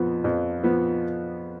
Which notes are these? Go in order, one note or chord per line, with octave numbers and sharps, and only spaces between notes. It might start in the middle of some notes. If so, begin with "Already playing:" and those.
Already playing: F2 F3 B3
F2
F3 B3